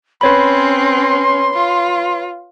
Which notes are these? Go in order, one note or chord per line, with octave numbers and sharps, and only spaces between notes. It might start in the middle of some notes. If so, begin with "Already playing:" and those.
C4 C#4 B4 C#5 B5 C6
F4